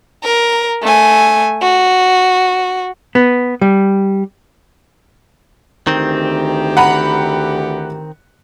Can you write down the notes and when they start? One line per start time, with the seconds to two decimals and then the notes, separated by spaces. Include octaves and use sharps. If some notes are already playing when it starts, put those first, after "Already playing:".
0.24 A#4
0.83 A3 G#5
1.62 F#4
3.15 B3
3.61 G3
5.87 D2 D#3 E3 C4 G4
6.77 F#5 A#5 B5